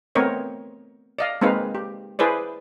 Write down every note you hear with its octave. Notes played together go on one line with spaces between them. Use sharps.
A3 B3 C4 A#4 C#5 D#5
D5 D#5 F5
G#3 A#3 C4 D#4 B4 F5
G4
E4 G#4 B4 C5 D5